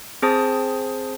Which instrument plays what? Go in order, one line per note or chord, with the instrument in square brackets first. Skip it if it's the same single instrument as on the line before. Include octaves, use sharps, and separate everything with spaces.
[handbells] C4 G#4 C5 A5 D#6